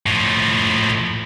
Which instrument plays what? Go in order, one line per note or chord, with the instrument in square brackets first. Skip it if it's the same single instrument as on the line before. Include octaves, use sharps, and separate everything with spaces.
[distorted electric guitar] A2 F3